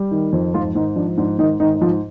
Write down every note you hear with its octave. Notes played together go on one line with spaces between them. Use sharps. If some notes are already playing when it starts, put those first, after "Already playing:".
Already playing: G3
D#3
F2
G#2 F3 F4
G#2 D#3 D#4
F3 D4
G#2 D4
G#2 D#3 D#4
G#2 D#3 D#4
D#4
G#2 F3 F4